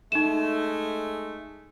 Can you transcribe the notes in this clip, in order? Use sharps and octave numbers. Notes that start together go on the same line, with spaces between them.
G#3 A3 D#4 E7